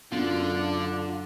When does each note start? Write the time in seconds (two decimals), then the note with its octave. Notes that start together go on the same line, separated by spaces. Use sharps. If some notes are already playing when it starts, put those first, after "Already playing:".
0.12 F#2 D3 D4 F4